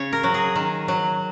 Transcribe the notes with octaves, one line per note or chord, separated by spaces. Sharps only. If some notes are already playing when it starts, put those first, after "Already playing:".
Already playing: C#3 C#4 C#5
A#4
F#3
G#4
D#3
F#3